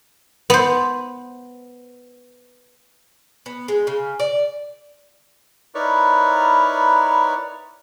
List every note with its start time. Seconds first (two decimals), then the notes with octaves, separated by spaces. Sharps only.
0.50 B3 C5
3.46 B3
3.68 G#3
3.87 C#3
4.20 D5
5.75 D#4 E4 A#4 B4 C#5 D5